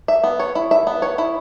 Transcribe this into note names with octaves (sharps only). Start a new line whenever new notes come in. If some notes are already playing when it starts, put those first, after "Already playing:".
E5
B3
C#5
E4
E5
B3
C#5
E4